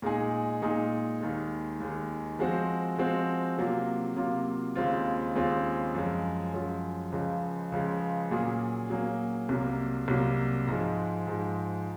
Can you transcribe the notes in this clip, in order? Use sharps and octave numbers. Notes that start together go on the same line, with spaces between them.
A#2 G#3 D#4 G#4
A#2 G#3 D#4 G#4
D#2 D#3 G#3
D#2 D#3 G#3
F3 G#3 C4 F#4 C5
F3 G#3 C4 F#4 C5
C3 F#3 A#3 F4
C3 F#3 A#3 F4
D#2 C#3 G#3 C4 F4
D#2 C#3 G#3 C4 F4
F#2 F3 G#3
F#2 F3 G#3
C#2 C#3 F3 G#3
C#2 C#3 F3 G#3
A#2 F#3 A#3 C#4 G#4
A#2 F#3 A#3 C#4 G#4
C2 C3 F#3 A#3
C2 C3 F#3 A#3
G#2 F3 G#3
G#2 F3 G#3